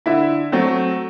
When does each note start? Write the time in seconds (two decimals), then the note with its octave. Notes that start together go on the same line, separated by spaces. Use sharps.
0.06 D3 E4 E5
0.52 F#3 A3 C4